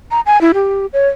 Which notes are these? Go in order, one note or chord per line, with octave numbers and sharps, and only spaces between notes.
A#5
G#5
E4
G4
C#5